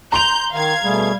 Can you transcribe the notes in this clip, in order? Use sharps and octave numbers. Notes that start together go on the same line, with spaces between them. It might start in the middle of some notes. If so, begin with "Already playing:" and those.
A#5 C6 G6 F7
D#3 F5 G#6
B2 G3 A3 G#4